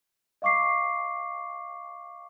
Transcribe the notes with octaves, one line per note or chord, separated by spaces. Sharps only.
D#5 F5 C#6 D6 C7